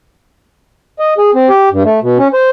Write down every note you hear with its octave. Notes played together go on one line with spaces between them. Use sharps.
D#5
G#4
C4
G4
G2
A3
B2
C#4
C5